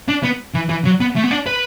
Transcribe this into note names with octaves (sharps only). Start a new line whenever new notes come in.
D4
B3
E3
E3
F#3
B3
A3
B3
D4
B4